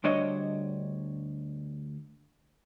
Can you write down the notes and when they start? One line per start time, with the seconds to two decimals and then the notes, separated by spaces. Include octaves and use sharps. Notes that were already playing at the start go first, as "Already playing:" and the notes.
0.04 D2 G3 D4 C5 C#5 D#5